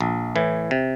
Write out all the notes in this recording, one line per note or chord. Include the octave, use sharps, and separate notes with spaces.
A#1
A2 E3
C3